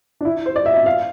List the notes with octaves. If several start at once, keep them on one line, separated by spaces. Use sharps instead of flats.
D4
E4
C5
D5
E5
E5
F5